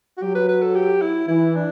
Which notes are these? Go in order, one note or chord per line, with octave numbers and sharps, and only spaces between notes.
F#4
F#3 G4
B4
B4
A4
G4
E4
E3 E4
D4